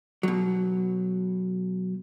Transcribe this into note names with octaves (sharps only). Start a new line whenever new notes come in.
B2 F#3